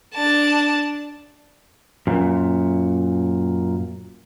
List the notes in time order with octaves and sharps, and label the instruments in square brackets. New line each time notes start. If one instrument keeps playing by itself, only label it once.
[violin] D4 A5
[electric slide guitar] F#2 A#2